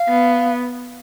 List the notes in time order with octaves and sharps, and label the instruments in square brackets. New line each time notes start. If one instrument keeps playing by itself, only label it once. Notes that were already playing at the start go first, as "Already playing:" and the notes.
Already playing: [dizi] F5
[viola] B3